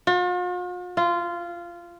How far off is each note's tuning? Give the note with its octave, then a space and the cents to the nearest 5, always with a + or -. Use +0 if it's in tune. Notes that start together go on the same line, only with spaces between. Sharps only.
F4 +45
F4 -15